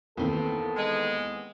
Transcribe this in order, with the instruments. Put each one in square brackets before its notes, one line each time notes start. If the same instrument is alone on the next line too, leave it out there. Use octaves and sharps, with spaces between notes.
[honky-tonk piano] D#2 D#3 E3 [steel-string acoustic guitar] B3 C4 [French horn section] A4 B4
[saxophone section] G#3